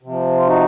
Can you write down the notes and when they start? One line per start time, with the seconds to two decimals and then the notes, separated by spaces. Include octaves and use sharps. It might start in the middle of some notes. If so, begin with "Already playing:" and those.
0.03 C3 F3
0.38 F4
0.47 D#4 F#4